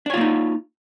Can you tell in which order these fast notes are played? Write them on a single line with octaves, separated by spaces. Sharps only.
D4 C#5 F4 A#3 D#4